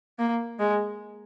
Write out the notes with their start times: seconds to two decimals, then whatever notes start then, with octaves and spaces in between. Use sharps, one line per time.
0.19 A#3
0.60 G#3